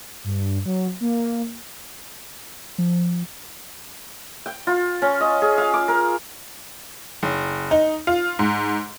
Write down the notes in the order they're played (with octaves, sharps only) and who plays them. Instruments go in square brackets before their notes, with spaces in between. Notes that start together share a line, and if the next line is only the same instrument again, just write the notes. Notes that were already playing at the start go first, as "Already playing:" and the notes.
[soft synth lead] G2
F#3
A#3
[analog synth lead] F3
[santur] G5
F4
C#4
D#5
G#4
F5
D6
A#4
[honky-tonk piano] F#1
D#4
F4
G#2